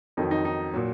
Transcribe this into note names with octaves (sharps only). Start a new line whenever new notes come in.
F2 D#3 F#3 D#4
D#4
D#4
A#2 F#3